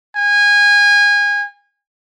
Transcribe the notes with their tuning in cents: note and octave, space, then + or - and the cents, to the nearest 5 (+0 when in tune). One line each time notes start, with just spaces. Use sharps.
G#5 -25